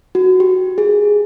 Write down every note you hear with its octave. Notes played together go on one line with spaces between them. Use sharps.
F#4
G4
G#4